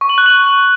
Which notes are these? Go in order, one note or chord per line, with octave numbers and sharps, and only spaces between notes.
C#6
F#7
F#6
F#7